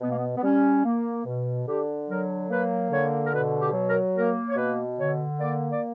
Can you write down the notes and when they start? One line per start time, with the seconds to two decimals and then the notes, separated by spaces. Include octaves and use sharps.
0.01 B2 B3
0.09 A#3
0.17 B3
0.36 B3
0.43 G3 C#4
0.84 A#3
1.25 B2
1.67 D3 G4
2.08 F#3 A#4
2.49 A#3 B4
2.91 D3 C#5
3.23 A#4
3.32 B2 B4
3.60 G4
3.73 F#3
3.87 A#4
4.15 A#3 A#4
4.49 C#5
4.56 B2 B4
4.97 D3 C#5
5.39 A#3 D5
5.69 D5